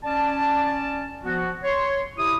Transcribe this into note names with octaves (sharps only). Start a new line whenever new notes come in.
C#4 D5 A5
F3 B3 F#4
C#5 C6
C3 E4 D#6